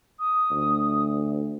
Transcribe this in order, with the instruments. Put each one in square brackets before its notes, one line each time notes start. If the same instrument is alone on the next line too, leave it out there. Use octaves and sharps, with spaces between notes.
[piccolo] D#6
[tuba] D2